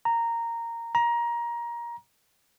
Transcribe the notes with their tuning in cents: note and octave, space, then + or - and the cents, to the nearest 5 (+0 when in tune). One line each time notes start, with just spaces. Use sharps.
A#5 -10
A#5 +20